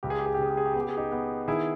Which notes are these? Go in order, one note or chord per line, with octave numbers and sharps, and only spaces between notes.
C#2 G4
G#4
G4
G#4
G4
C#3 G#4
G4
G#4
G4
B3 G#4
G4
G#4
D#4 G4
B3
D#3 E4 G#4